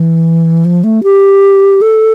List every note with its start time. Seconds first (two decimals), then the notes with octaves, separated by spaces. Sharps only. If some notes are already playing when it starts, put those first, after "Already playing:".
Already playing: E3
0.65 F3
0.84 A3
1.03 G4
1.81 A4